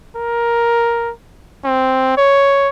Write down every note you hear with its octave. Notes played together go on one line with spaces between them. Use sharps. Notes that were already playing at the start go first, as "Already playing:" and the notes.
A#4
C4
C#5